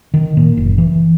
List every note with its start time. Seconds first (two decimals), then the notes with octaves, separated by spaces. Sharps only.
0.14 D#3
0.37 A#2
0.57 F#1
0.78 E3